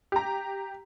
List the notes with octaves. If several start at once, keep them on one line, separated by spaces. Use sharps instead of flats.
G4 A#5